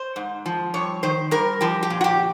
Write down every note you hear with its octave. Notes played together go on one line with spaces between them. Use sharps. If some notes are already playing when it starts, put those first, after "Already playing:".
Already playing: C5
G#2
F3
G2 C#5
D#3 C5
G2 A#4
F3 G4
G4
A#2
F#4
G4